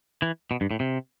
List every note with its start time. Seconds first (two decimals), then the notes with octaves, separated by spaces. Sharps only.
0.22 E3
0.51 B2
0.61 G2
0.71 A2
0.80 C3